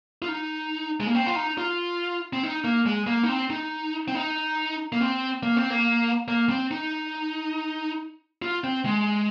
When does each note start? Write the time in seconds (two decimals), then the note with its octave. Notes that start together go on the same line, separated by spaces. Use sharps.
0.22 F4
0.28 D#4
1.00 G#3
1.07 A#3
1.15 C4
1.26 F4
1.36 D#4
1.58 F4
2.33 C4
2.43 D#4
2.64 A#3
2.86 G#3
3.07 A#3
3.23 D#4
3.29 C4
3.50 D#4
4.08 C4
4.15 D#4
4.92 A#3
5.01 C4
5.43 A#3
5.57 C4
5.70 A#3
6.28 A#3
6.49 C4
6.71 D#4
8.42 F4
8.64 C4
8.85 G#3